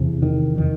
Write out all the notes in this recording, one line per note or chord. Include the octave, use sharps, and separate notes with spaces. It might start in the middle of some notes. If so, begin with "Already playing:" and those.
Already playing: E2 C3
D#3
D#3